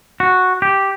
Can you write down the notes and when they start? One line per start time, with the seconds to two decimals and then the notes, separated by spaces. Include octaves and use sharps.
0.20 F#4
0.62 G4